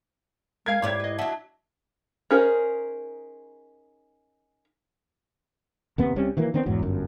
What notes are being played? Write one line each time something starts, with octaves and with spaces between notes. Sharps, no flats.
G#3 A#4 F5 G#5 G#6 C7
G#2 E4 G4 C#5 D5 D6 G#6
B4 D#5
F#3 D4 D#5 E5 F#5 A5
C#4 D#4 G#4 A#4 C5
D#2 C3 B3
C2 C3 G3 C#4
D#3 E3 F#3 A#3
D#3 B3 C4 D4
B1 E2 G#2 F#3
G1 F#2